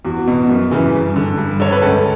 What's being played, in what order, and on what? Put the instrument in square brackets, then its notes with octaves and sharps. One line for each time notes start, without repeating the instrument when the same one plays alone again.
[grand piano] E2 F#4
B2
F#2
C#3 E3
G2
D3
G2
D3 C#5
B4
C#2 A4